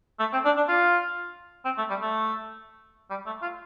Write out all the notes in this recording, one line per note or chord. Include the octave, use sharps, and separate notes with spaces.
A3
C4
D4
D4
F4
C4
A3
G3
A3
G3
A3
F4